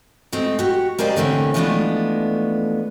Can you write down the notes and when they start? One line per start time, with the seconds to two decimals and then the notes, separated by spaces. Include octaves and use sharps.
0.33 G#3 A3 C4 C5
0.59 F#4 G4
0.99 A#3 G4 G#4 C5 D5 D#5
1.16 A#2 D3 E3 A3 C4 C#4
1.54 E3 F3 G#3 A3 B3 D4